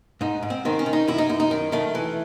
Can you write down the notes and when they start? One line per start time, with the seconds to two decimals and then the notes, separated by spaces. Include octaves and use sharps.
0.21 G#2 D#4
0.43 G#2
0.50 C4
0.65 D#3 C4
0.79 C#4
0.86 D#3
0.93 D#4
1.08 F#2 E4
1.18 D#4
1.29 F#2 D#4
1.40 D#4
1.51 D#3
1.72 D#3 A3
1.95 E3